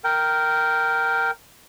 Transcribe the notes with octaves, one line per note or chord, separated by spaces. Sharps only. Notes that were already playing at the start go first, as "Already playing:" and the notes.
A#4 G5